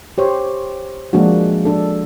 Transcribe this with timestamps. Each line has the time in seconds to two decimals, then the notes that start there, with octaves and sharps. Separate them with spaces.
0.18 G4 C5 C#5
1.13 F3 G#3 A#3 D4 F#4
1.65 D4 A4